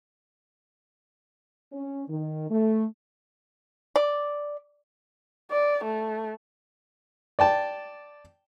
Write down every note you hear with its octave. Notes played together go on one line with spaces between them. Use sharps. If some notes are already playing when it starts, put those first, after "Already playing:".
C#4
D#3
A3
D5
D5
A3
D5 G5 A5